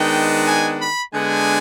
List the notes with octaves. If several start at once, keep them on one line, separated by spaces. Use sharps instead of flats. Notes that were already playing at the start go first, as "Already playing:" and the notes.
Already playing: D#3 G#3 B3 D4 G5
G#5
B5
D3 G#3 B3 D4 G#5